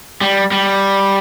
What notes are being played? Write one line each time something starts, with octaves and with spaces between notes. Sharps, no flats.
G3
G3